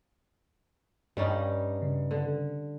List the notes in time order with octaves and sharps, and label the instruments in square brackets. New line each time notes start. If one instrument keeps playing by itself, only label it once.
[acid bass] G2 [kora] G3 C#4 D#4
[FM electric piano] C#3
[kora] D3